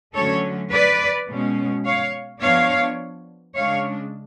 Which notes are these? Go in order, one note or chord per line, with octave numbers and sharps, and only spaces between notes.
D3 F#3 A3 C#4 A4 C#5
B4 D5
B2 G#3 C#4
C#5 F5
F3 B3 D4 C#5 F5
C#3 G#3 D4 C#5 F5